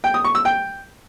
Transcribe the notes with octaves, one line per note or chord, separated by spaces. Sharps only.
G5
D#6
C#6
E6
G5